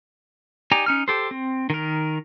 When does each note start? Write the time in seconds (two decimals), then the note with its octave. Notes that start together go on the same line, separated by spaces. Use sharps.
0.71 D#4 G4 D5 G#5 A#5
0.86 C#4 D#4 F6
1.08 G4 A4 C5
1.31 C4
1.70 D#3 A#4